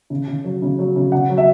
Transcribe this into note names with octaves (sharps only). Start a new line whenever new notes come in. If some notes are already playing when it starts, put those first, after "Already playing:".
C#3
C#3
F#3
C#3
F#3
C#3
C#3 F#5
F#3
E5